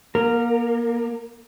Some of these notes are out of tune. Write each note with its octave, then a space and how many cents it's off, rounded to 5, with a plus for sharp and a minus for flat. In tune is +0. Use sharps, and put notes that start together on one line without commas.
A#3 +30 A#4 -10